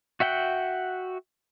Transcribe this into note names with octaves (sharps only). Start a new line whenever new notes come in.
F#4 E5 F#5 G5